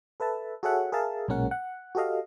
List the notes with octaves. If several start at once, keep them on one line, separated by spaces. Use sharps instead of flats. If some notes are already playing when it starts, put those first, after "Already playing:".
A4 B4 E5 A5
F#4 G#4 A4 C#5 E5 F#5
G#4 A#4 E5 F5 A5
B1 A#2 G#3 C#4 A#4 F#5
F#5
F#4 G4 A4 D#5 F5